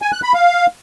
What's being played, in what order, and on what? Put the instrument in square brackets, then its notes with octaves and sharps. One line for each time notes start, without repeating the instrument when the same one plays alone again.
[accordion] G#5
F#6
B5
F5